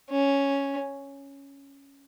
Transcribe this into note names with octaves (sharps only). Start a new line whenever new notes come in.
C#4